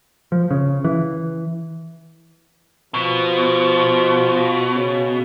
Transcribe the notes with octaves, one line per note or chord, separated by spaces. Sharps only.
F3
C#3
E3
B2 F3
C#3